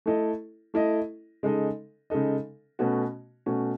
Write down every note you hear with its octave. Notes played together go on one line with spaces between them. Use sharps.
A3 E4 A4 D#5
A3 E4 A4 D#5
C#3 G#3 D#4 A4 D#5
C#3 G#3 D#4 A4 D#5
B2 A3 C#4 F#4
B2 A3 C#4 F#4